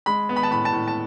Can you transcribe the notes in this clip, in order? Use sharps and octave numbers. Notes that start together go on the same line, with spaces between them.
G#3 B5
B3
B5
A5
A2 B5
A5
A2
A5